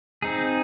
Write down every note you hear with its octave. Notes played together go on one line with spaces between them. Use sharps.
C4 D#4 G#4